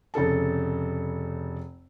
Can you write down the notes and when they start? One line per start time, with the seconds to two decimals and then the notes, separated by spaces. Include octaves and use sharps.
0.14 F1 C#3 A4 A5